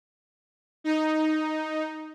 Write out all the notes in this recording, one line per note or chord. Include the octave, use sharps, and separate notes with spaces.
D#4